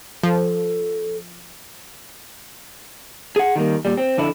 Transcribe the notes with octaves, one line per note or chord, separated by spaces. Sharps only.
F3 A4
G#4 F#5
D#3 G3 A#3
A#2 G3
C4
F2 D3 E4